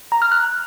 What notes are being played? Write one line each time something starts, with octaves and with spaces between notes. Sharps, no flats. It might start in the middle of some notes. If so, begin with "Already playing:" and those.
A#5
F6
F#6